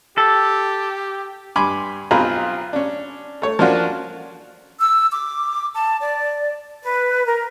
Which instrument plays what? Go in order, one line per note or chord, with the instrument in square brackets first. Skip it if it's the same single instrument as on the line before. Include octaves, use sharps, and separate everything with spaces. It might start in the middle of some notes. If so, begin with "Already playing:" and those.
[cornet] G4 [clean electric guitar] A4
[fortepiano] G2 G#5 B5 C6 D6
B1 C4 F4 G#5 A#5 B5
C#4 D4
A3 C#5
F3 A#3 C#4 D4 F4 F#4
[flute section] E6
D6
A5
D5
B4
A#4